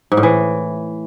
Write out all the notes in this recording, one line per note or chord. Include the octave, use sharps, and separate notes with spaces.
G#2
A2
E3